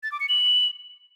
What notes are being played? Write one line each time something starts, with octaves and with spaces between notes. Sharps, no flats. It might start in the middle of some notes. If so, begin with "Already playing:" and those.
A6
D6
C#7
F#7